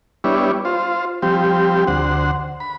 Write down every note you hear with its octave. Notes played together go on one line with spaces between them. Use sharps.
G3 B3 D4 E4 C#5
F4 C5
F3 G3 C4 G4
D2 C5 F#5
B5